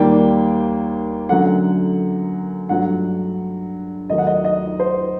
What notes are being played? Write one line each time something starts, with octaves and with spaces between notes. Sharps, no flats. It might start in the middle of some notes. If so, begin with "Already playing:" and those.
Already playing: D#2 D#3 G3 A#3 G5
F#2 D3 F#3 A3 F#5
G2 F#3 A3 F#5
D#2 D#3 F#3 A3 D#5
F#5
D#5
D#5
C5